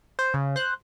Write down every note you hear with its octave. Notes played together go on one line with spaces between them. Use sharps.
C5
C#3
C5 F#6